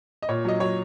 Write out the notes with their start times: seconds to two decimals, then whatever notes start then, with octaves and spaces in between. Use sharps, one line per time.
0.22 D#5
0.29 A#2 C#5
0.45 F#3 D#5
0.60 F#3 C#5